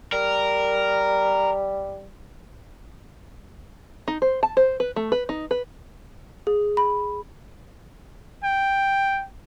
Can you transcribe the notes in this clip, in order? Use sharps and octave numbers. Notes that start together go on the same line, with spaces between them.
G3 A#4
D#4
C5
A5
C5
B4
A3
B4
D#4
B4
G#4
B5
G5